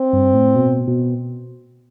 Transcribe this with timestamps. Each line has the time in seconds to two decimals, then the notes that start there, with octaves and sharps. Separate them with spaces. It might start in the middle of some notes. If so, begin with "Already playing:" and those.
Already playing: C4
0.13 G2
0.34 A2
0.56 B2
0.87 B2